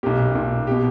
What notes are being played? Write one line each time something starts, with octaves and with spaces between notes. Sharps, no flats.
B1 A#2 G4
B1 A#2
B2 G4